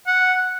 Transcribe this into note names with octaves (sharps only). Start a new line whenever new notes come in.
F#5